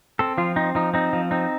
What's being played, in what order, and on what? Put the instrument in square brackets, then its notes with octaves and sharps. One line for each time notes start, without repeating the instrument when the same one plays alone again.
[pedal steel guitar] C4 A4
F3 F4
C4 D#4
F3 D#4
C4 D#4
F3
C4 D#4